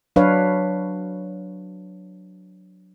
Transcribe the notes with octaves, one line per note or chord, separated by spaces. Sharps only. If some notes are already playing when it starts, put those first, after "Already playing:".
F#3 D4 B4 C#5 F5